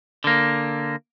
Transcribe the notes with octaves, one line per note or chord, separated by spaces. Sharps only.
D3 A#3